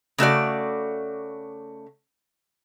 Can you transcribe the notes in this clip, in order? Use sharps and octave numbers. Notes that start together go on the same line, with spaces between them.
C#3 A3 F#4 D5